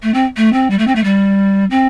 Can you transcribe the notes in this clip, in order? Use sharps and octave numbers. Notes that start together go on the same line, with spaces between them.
A3
C4
A3
C4
G3
A3
C4
A3
G3
C4